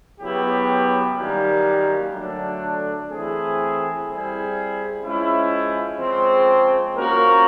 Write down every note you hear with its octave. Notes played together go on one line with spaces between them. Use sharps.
C#3 F#3 B3 E4 G4
F#2 D#3 G3 A#3
D3 F#3 A3 D4
E3 A3 C4 E4 G#4
G3 C4 E4 G#4
F3 G#3 C#4 E4
C#3 F3 G#3 C4
F3 A#3 C#4 F#4 A#4